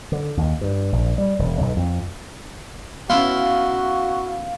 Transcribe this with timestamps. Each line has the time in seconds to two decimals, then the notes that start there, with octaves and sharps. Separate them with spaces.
0.12 D3
0.37 D#2
0.61 G2
0.92 A#1
1.18 G3
1.39 E1
1.61 B1
1.77 F2
3.10 B3 C#4 E4 F#4 F5 F#5 C6